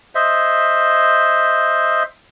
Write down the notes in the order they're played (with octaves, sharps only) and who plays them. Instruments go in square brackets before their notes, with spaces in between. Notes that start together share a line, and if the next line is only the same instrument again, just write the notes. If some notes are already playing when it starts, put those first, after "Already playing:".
[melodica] C5 D#5 E5